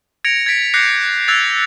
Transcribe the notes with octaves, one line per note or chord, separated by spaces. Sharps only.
G#6 A#6 C#7 D7 F7
G#6 A6 B6 D7
D6 F#6 G6 A#6 C7 C#7
E6 F#6 G#6 A6 F7